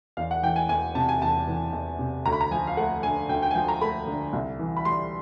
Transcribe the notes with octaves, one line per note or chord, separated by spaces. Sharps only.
E2 F5
F#5
E3 G5
G#5
E2 G#5
C3 A5
G#5
E2 A5
E3
E2
C3
D2 A#5
B5
A#5
F3 G#5
F5
A3 F#5
D3 G#5
D2 G5
G5
G#5
F3 G5
A#5
A3 B5
D3
C2
E3
B5
G3 C6